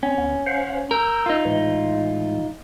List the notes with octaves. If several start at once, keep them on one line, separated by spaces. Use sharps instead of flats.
C4 C#4
D2 B3
C5 F5 F#5
A#4 E6 G6
D#4 F4
A2 E3 G#3